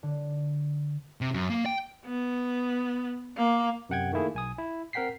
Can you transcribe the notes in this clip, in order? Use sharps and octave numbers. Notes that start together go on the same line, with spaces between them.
D3
C3
F#2
A#3
G5
B3
A#3
F#2 C3 F#5 G5 G#6
D#3 A3 A#3 E4 G#4
B1 G#5 D#6
E4
C4 A#4 F#5 G5 B6 C7